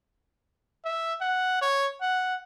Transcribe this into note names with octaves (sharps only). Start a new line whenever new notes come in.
E5
F#5
C#5
F#5